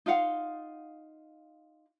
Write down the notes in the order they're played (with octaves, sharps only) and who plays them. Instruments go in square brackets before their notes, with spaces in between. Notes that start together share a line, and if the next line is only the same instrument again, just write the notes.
[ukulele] D#4 F4 F5 F#5